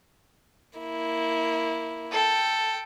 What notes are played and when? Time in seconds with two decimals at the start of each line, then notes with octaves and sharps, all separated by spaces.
0.79 A#3 E4
2.11 A4 G5